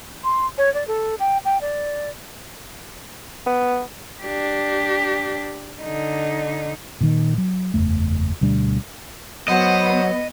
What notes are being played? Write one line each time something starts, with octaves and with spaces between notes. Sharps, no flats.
C6
C#5
D5
A4
G5
G5
D5
B3
D4 G4
D3 D#4
A#2 D#3
F#3
F#1 E2 A3
D2 B2 G3 D4
F#3 B3 C5 D#5 F#5